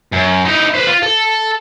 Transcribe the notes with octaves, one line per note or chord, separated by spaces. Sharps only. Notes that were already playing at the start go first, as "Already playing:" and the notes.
F#2
D#4 E4
B4 C5
F4
A4